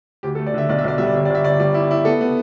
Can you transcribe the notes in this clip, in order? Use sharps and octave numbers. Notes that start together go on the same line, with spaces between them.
D2 G4
A4
A3
D5
D3 E5
B1 D5
E5
B1 D5
G3 E5
D5
G1 E5
D5
G1 E5
G1 D5
G3 D5
E4
E4
B3 A4
B3